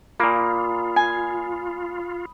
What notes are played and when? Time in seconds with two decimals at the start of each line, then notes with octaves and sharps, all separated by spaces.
0.20 A#2 A#3 F4 B5 D#6
0.96 G#5